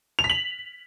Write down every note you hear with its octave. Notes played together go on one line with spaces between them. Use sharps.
F7
B6
F#7